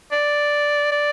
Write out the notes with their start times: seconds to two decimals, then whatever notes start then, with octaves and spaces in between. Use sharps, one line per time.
0.12 D5
0.92 D5